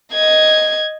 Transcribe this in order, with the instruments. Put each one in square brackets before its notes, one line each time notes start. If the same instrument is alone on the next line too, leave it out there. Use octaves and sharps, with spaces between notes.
[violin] D#5 G#6